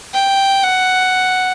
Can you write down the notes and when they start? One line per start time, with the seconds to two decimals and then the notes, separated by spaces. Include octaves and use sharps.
0.14 G5
0.64 F#5